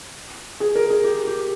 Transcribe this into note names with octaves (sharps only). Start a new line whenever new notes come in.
G#4
A#4
G#4
G4
G4